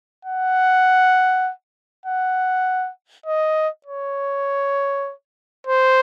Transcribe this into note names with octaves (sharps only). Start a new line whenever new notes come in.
F#5
F#5
D#5
C#5
C5